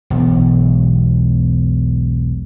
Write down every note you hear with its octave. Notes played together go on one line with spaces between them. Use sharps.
E1 B1